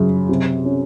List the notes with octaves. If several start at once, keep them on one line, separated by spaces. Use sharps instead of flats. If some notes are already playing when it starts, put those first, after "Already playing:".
Already playing: F#2 C#3
C3
C#4